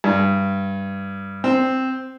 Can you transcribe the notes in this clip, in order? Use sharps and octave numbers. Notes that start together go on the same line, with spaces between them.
G2
C4